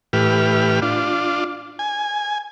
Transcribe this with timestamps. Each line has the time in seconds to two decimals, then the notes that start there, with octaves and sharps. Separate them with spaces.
0.13 A2 E3 G4 B4 F6
0.82 D4 F4
1.79 G#5